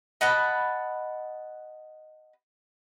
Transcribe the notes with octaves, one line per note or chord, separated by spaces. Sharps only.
D#5 F#5 A5 B5